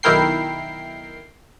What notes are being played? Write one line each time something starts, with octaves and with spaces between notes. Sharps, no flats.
B1 D#3 E4 A#4 G5 C7